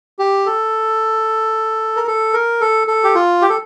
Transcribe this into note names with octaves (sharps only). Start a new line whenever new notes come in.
G4
A4
A#4
A4
A#4
A4
A4
G4
F4
G4
A4